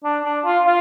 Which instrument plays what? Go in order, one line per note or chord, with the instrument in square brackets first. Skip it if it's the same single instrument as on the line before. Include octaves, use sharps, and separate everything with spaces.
[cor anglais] D4
D4
F4
F4